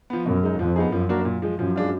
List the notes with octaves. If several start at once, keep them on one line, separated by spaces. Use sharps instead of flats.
F3 B3
F#2 B2
G#3 D#4
F2 F3
B3 D#4 G#4
F#2 F3
A#3 D4 F#4 A#4
A#2
F3 G#3
F#2 F3
G#3 D4 F4